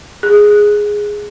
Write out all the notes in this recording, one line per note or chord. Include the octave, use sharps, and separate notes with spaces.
G#4